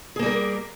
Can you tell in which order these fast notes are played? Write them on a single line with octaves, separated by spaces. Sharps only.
G#4 A#3 G3 A#4